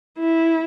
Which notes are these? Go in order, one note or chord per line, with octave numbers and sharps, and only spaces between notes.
E4